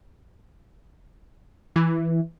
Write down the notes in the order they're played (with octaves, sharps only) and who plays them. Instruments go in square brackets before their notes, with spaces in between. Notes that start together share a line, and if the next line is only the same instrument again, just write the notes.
[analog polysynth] E3